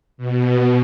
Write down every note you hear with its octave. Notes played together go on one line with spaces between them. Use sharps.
B2